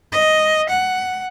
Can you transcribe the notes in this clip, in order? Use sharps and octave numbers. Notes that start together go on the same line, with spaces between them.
D#5
F#5